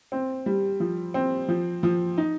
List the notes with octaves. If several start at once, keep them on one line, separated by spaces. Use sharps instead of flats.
C4
G3
F3
C4
F3
F3
D#4